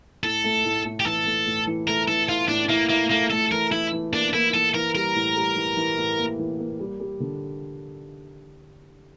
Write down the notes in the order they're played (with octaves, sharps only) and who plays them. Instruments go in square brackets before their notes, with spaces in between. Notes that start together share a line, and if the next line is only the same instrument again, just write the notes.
[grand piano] A2 [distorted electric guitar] A4
[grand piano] A3
A2
A2
[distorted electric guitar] G4
[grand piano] E3 [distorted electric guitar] A4
[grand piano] A3
A2
E3
[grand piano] A3 [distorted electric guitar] A#4
[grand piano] E3 [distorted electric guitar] A4
[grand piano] E4 [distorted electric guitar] F4
[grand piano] A2 [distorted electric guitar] D4
[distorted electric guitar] A#3 [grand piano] E4
[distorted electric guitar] A#3 [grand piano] E4
[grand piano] A3 [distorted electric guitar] A#3
[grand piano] A3 [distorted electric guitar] A4
[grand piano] E3 [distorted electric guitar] A#4
[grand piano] E3 [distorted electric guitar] E4
[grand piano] E3
[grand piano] A#3 [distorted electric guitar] D4
[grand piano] A#3 [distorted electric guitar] E4
[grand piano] E3 [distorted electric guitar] A4
[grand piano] E3 [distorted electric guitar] A#4
[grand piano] G3 [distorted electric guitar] A#4
[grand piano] A2
G3
E3
E3
A2
A#3
E3
A#3
G3
G3
D3